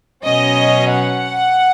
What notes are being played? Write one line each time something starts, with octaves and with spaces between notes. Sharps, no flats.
B2 F#3 C#4 D#5
F#5